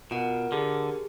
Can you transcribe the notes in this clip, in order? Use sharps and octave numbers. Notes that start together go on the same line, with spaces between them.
B2 F4 A#4 F#5
D3 G4 G#4